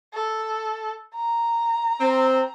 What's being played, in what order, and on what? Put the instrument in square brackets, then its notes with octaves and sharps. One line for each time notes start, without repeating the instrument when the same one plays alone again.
[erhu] A4
A#5
[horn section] C4